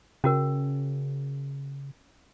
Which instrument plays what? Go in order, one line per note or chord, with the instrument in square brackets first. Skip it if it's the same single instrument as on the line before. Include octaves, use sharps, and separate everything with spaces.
[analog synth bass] C#3 [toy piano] C#4 F#4 A#4